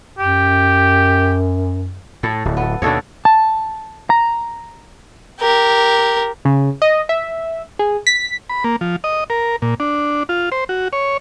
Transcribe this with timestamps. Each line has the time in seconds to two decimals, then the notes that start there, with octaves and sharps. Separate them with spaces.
0.19 F#2 G4
2.23 A2 A4
2.45 D1
2.57 B3 A4
2.82 D#2 B2 D4 A4 C#5
3.25 A5
4.10 A#5
5.40 G4 A#4
6.45 C#3
6.82 D#5
7.09 E5
7.79 G#4
8.07 B6
8.50 B5
8.64 A#3
8.81 F3
9.04 D#5
9.30 A#4
9.62 A#2
9.80 D4
10.29 F4
10.52 C5
10.69 F#4
10.93 C#5